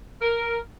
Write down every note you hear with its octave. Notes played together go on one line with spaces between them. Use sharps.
A#4